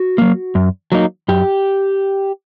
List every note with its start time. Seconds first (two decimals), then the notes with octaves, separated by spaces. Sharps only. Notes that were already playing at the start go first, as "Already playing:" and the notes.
Already playing: F#4
0.18 F#3 A#3
0.55 F#2
0.92 F#3 A#3 D#4
1.28 F#2 G4